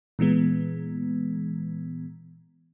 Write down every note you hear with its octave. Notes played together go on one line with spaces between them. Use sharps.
A#2 E3 G#3 B3